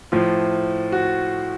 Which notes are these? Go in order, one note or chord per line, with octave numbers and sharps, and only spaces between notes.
A2 F3 F4
F#4